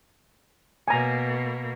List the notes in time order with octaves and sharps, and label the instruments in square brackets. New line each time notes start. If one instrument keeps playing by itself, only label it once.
[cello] B2 A#3 [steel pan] G#5 A#5